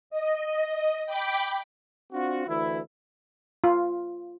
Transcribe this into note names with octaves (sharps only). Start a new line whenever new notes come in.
D#5
G5 B5 D6
C4 D4 F4 F#4
D2 E3 E4
F4